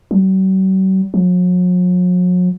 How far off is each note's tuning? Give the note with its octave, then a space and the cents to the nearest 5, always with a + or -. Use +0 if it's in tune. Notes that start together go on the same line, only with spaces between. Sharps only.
F#3 +45
F#3 -45